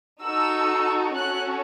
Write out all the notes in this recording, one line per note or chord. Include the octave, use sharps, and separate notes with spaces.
D#4 F#4 A4 E6
C#4 F#4 A4 F#6